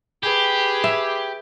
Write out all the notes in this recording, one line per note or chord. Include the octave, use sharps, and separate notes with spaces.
G4 G#4 B4
E5